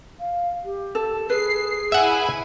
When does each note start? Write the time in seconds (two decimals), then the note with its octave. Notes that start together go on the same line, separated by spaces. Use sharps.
0.20 F5
0.64 G4
0.95 A4
1.30 G#4 B4 C7
1.92 E4 E5 F#5 G#5